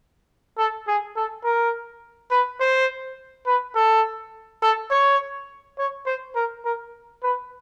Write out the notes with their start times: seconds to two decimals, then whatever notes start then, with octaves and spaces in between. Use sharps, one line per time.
0.58 A4
0.87 G#4
1.16 A4
1.44 A#4
2.31 B4
2.60 C5
3.46 B4
3.75 A4
4.62 A4
4.90 C#5
5.78 C#5
6.06 C5
6.35 A#4
6.64 A#4
7.23 B4